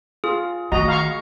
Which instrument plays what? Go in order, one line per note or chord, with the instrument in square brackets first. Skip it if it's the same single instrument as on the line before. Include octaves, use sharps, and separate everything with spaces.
[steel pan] F4 [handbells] G#4
[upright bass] D#3 A3 [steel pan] F#4 D#5 A#5
[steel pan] F5 A#5 C#6